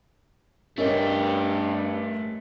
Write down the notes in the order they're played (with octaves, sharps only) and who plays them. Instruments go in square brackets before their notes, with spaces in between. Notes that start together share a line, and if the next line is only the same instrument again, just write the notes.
[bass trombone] G2 [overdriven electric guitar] A3 G4 [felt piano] C#4 A#4 D#5